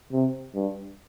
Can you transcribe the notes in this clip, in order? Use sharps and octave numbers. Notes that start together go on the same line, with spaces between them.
C3
G2